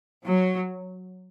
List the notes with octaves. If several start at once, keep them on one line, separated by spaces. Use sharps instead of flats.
F#3